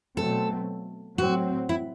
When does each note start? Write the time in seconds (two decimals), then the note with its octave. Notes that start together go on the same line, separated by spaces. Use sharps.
0.17 B2 F#3 A3 C4 A4
1.18 A2 F#3 C4 F#4
1.69 E4